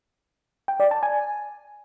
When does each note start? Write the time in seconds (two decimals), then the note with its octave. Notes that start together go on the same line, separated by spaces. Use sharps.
0.68 G5
0.80 D5
0.91 A5
1.03 G#5